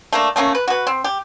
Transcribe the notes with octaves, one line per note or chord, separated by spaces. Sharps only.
A3 A#3 D4
A3 A#3 C4 C#4
B4
F#4 B4
C4
G4